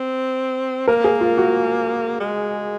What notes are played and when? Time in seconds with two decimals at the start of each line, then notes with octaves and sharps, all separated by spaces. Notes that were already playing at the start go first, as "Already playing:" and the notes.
Already playing: C4
0.88 A#3 A#4
1.04 G#4
1.21 F4
1.38 F#4
2.20 G#3